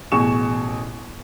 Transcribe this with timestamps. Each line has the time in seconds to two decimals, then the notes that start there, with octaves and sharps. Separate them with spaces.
0.12 A1 B2 G#4 C#6 E7